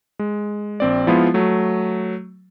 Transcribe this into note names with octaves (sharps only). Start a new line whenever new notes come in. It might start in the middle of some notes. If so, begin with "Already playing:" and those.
G#3
A#1 C4 D5
F3 G#3 B3 E4 F4
F#3 A3